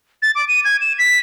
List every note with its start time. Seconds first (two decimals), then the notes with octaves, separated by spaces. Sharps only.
0.22 A6
0.35 D6
0.48 D#7
0.65 G#6
0.81 E7
0.99 B6